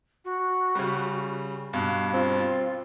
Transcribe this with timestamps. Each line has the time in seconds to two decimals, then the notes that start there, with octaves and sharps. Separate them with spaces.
0.25 F#4
0.75 C#3 G3
1.73 G2 B2 F5
2.14 C4 F4